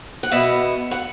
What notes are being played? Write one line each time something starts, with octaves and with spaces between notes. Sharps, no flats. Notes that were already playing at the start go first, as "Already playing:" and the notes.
F#5
B2 B3 E5
F#5